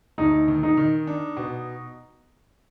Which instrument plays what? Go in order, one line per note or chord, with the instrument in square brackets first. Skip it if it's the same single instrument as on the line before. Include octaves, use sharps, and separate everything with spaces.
[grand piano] D2 [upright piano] D#4
[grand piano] D#3
[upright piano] D#4
[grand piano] D#3
D4
B2